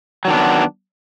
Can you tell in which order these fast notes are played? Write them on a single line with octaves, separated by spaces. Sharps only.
F#3 D#3 D4 B3